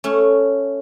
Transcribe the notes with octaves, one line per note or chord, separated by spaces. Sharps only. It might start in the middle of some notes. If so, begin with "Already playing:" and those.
A3 C#4